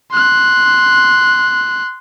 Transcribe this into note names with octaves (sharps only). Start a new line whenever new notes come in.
C6 F#6